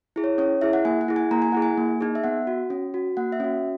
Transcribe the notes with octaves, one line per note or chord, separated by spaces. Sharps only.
E4 G#4
C#5
C#4 C#5
E4 G#4 E5
F#5
A#3 G#5
F#5
E4 G#4
G#5
A#3 A#5
G#5
E4 G#4 F#5
G#5
A#3
D#4 G#4
E5
B3 F#5
F#4
C#4
F#4
A#3 F#5
E5
C#4 F#4